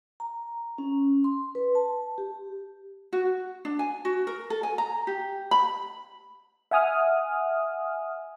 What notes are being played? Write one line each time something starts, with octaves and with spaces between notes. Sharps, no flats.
A#5
C#4
C6
B4
A5
G4
F#4
D4
G#5
F#4
A#4
A4
G#5
A#5
G4
B5
E5 F#5 G#5 D#6 F6